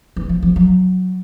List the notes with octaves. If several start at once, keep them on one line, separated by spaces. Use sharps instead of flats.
E3
F3
F3
F#3